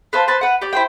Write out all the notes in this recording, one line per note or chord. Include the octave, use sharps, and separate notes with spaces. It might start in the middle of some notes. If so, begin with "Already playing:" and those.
B4 C5 F5 A5
B4 C5 A5
B4 F#5
G4 D5
E4 C5 G5